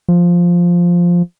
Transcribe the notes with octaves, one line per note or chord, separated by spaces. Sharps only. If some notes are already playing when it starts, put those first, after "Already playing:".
F3